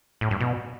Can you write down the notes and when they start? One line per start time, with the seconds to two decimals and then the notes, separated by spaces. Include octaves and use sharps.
0.21 A2
0.31 G2
0.40 B2